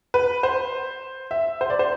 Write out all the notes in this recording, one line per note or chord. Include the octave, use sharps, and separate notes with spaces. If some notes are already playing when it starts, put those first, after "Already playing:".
B4
C5
E5
C5
D5
C5